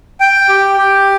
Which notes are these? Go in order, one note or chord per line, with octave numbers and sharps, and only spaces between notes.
G5
G4
G4